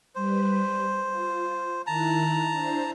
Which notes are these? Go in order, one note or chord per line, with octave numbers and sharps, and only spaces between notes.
G3 B4 C5
F4
D#3 E4 A5 A#5 F#6
D4 E4 C5